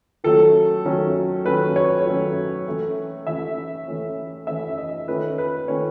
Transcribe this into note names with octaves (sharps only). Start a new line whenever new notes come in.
D#3 F#3 A3 C#4 A4
D#3 F#3 A3 C#4
D#3 F#3 A3 C#4 B4
C#5
D#3 F#3 A3 C#4
E3 A3 C#4
E3 A3 C#4 E5
E3 A3 C#4
E3 A3 C#4 E5
D#5
D#3 A3 C#4 B4
B4
D#3 A3 C#4 C#5